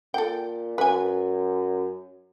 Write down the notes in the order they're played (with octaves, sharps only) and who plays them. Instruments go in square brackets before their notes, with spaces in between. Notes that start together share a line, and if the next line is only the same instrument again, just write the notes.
[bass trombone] A#2 [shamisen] A4 G5
[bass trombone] F#2 [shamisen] B4 G#5